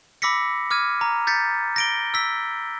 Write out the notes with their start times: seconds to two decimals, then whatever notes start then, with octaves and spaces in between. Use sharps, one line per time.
0.22 B5 D6 E6 A#6 B6 C#7
0.71 D6 F6 G#6 D#7
1.01 A#5
1.27 G6 A6 B6 C#7
1.76 A#6 D7 G7
2.14 E6 B6